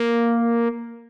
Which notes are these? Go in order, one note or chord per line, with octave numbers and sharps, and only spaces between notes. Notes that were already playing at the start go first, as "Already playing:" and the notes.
Already playing: A#3